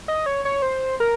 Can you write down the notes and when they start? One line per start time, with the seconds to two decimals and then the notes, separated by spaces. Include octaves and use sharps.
0.08 D#5
0.26 C#5
0.45 C#5
0.62 C5
1.00 A#4